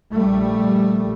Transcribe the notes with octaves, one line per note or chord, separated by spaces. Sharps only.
A#1 G3 A3